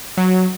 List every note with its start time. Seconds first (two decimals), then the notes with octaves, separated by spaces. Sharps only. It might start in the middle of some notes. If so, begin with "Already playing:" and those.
0.17 F#3